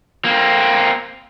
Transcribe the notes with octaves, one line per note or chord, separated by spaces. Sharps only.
A#3 C4